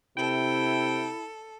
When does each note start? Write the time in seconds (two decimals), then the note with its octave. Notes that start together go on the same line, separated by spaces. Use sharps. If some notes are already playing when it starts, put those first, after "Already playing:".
0.17 C3 E4 A4 G5